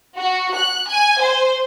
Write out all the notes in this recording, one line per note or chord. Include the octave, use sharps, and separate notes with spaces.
F#4
F#6
G#5
C5